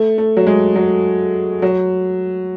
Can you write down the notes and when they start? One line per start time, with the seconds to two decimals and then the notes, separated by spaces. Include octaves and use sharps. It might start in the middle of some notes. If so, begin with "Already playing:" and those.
Already playing: A3
0.18 A3
0.37 F#3
0.47 G#3
0.76 F#3
1.62 F#3